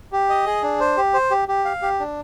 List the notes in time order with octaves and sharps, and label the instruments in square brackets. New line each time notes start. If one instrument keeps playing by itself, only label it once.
[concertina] G4
D#5
G#4
D4
C5
G4
C5
G4
G4
F5
G4
D4